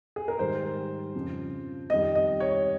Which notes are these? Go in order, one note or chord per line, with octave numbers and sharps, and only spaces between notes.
G#4
A#4
G#2 D#3 G3 C5
F2 C#3 F3
F2 D#3 G3 D#5
D#5
C#5